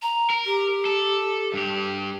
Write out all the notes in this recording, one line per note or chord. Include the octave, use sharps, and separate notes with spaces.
A#5
A#4
G4
A4
G2 G4